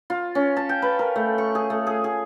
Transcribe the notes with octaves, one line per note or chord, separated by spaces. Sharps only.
F4
C#4
A5
G5
B4
A#4
A3
C#6
G#4
A3
G#4
G#4